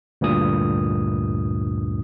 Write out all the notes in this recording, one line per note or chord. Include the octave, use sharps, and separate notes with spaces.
D2 G2 A#2 D#6